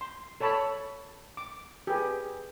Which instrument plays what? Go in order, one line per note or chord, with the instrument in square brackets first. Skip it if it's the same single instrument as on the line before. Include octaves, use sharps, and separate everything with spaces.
[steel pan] C6
A4 C#5 A5 B5
D6
G4 G#4 B4